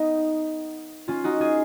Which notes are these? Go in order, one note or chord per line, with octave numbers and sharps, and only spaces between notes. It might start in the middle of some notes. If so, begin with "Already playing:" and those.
Already playing: B3 D#4
C#4 F4
D#4 F#4
F4 G#4